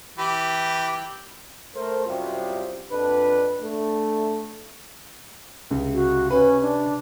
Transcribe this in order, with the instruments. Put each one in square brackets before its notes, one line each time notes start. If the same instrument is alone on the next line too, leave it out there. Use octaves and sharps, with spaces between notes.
[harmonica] E3 G4 B5
[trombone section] A3 A#4 C5
C2 F#2 C3 F4 G4 C5
F2 D4 B4
A3 D4
[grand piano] C#2 [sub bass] C3
[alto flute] F#4
[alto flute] C#4 [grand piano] B4
[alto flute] D4